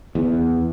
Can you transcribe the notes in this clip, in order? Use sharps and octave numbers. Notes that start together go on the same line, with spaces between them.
E2